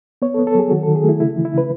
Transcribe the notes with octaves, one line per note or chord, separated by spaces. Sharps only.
B3 C#5
A4
B3
A4
F#3 G#4
D#3 F#4
D#3 A4
G#4
A3 E4
C#3 E4
E3
E4
C#3 B4